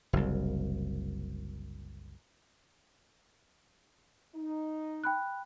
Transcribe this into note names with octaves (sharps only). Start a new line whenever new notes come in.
F#1 C2
D#4
G5 B5 F#6